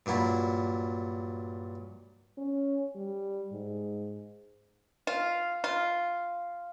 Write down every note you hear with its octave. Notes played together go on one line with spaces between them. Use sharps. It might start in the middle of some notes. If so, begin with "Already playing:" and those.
G2 A#2 F#3 E4
C#4
G3
G#2
F4
F4